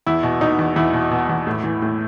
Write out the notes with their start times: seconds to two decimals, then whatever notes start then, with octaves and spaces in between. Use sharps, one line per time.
0.07 E2 E4
0.23 B2
0.41 B2 D#4
0.59 E2
0.76 E2 E4
0.94 B2
1.11 B2
1.29 E2
1.47 A2
1.64 E3
1.82 A2